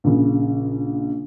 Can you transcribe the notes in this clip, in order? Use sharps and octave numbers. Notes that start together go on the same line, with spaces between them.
A#1 C#3